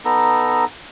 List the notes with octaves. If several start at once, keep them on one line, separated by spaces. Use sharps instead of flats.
B3 D#4 A4 A#5